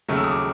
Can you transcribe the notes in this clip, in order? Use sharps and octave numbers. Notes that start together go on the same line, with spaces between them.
D#2 C#3 F#3 A3
E6
D#6
D6